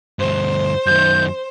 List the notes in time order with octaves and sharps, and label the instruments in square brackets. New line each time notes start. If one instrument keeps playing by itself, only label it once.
[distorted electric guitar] D2 G2 [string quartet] C5
[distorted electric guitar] F#2 D#3 [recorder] G6